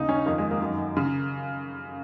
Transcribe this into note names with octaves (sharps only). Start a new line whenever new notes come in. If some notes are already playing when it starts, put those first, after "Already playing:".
Already playing: D#2 C#3 D#4
C#4
F2 D#3 A#3
G#3
A#3
F#2 D#3
C#3